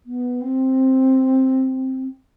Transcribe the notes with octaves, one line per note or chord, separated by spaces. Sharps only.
B3
C4